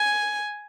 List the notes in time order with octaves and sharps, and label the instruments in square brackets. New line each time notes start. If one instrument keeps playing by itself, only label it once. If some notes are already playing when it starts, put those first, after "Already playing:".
Already playing: [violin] G#5